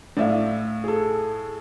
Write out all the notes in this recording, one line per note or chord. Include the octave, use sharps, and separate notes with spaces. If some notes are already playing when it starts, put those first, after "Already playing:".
A2 D5 E5 F5
G#4 A4